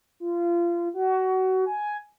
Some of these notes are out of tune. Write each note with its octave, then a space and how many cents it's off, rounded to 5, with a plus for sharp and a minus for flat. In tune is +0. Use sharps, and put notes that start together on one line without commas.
F4 -25
F#4 +25
G#5 +10